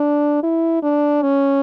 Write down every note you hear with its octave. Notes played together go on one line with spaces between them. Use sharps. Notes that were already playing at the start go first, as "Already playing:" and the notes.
Already playing: D4
E4
D4
C#4